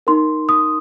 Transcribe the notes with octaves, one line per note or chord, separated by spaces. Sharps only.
D#4 A#4 C6
D#6